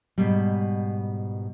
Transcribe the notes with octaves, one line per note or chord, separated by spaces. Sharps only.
G#2 B2 G3